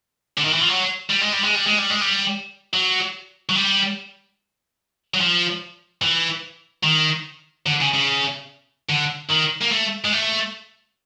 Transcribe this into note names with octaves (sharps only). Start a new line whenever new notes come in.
D3
D#3
E3
F3
F#3
G3
G#3
G3
G#3
G3
G#3
G3
G#3
G3
F#3
F#3
G3
F#3
F3
E3
D#3
D3
C#3
C#3
D3
D#3
A#3
A3
G#3
A3